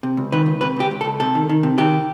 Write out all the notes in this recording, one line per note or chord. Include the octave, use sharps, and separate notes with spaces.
C3
C#2
D#3 B4
C#2
C3 B4
C#2 G4
C#2
A4
C#2
C3 A4
D#3
D#3
C3
D#3 G4